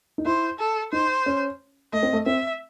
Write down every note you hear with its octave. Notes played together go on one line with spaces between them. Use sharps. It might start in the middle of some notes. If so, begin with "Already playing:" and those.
D#4
E4 C5
A4
D#4 C5
C#4
A3 D#5
C4
A3
C4 E5